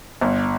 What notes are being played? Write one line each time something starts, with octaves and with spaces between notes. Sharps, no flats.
G1